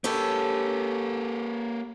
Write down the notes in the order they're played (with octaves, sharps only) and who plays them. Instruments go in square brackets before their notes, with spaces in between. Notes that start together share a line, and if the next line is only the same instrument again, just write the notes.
[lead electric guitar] A#3 B4 [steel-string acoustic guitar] C#4 G4 A4